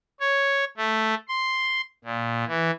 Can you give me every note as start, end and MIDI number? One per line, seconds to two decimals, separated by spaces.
0.20 0.65 73
0.77 1.15 57
1.28 1.81 84
2.04 2.44 46
2.47 2.71 52